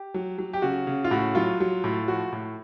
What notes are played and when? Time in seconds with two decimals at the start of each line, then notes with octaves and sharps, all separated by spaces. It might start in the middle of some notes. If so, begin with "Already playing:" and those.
Already playing: G4
0.14 F#3
0.38 F#3
0.53 G4
0.62 C#3 F#4
0.87 C#3
1.04 F4
1.11 A2 F#4
1.35 F#3 F4
1.60 F#3
1.84 A2
2.08 F3 F#4
2.32 A2